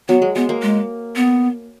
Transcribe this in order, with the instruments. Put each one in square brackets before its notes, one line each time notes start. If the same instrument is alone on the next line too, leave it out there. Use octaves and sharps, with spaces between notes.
[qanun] F#3 [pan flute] B3
[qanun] G#3
[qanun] G#3 [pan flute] B3
[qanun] A#3
[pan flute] G#3
B3